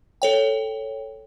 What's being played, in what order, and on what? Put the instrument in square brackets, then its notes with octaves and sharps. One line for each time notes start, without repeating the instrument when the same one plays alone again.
[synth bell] A4 C#5 G5